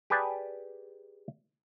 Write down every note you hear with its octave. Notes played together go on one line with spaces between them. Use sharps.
G4 G#4 B4 D5 G#5 A5